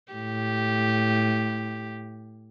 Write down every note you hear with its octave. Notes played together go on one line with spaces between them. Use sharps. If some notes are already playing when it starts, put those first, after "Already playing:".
A2 G4